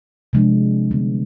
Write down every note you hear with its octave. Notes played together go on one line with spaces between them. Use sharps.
C3 F3 G#3 D4
D3 G3 B3